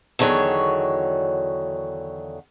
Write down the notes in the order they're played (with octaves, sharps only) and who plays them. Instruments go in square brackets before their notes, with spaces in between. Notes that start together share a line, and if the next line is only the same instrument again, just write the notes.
[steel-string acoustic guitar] E2 D3 D#3 F#3 C#5